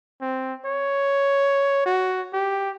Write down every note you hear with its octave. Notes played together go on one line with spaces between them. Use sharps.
C4
C#5
F#4
G4